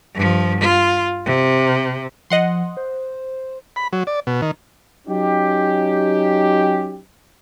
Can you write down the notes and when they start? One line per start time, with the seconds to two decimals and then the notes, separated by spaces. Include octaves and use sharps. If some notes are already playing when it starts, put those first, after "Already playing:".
0.15 G2 F3
0.61 F4
1.25 C3
2.30 F3 D#5 F#5 C6
2.77 C5
3.76 B5
3.93 F#3
4.07 D5
4.27 B2
4.42 D#3
5.07 F#3 C#4 D#4 G4